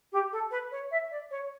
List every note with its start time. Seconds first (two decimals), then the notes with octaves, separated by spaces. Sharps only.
0.12 G4
0.32 A4
0.51 B4
0.71 C#5
0.91 E5
1.11 D5
1.31 C#5